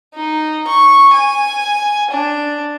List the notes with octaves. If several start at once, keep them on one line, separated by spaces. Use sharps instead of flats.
D#4
C#6
G#5
D4